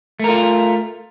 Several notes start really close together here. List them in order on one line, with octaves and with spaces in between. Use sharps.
A3 A#4 F4